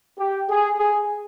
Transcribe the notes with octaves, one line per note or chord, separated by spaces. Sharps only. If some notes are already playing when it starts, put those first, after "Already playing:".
G4
G#4
G#4